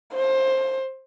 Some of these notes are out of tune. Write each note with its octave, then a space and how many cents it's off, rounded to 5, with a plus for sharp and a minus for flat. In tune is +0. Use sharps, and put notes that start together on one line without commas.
C5 +20